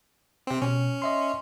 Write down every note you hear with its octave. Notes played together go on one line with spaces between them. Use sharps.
C3 C4
B2 C#4
D#5 E5 C6